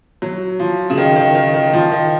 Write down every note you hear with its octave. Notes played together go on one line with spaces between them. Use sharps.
F#3
F3
C#3
D#3
D#3
D#3
D#3
F3
D#3